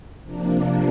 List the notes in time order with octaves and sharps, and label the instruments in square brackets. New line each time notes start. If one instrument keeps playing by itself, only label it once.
[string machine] C3 F3 A#3 D4